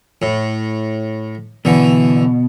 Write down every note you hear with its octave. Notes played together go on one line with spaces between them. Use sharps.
A2
B2 D3 E3